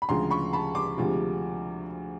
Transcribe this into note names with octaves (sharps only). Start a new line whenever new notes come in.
B5
D2 C#3 F3 G#3 A#5 C6
B5 C#6
A5 B5
C6 D6
D2 C3 F3 G#3